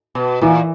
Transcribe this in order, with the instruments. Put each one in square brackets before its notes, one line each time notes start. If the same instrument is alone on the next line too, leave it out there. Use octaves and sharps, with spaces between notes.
[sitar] B2
[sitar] A#2 [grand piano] E3